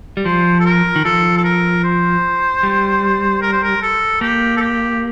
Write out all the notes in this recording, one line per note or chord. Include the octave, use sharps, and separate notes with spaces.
G3
F3 C5
A4
A#4
D#3
F3 A4
A4
A#4
C5
G3
A#4
C5
A#4
A4
A#3 G4
A4
G4